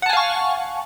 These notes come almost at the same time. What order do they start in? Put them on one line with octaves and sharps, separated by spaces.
F#5 A5 G#5 F5 C#6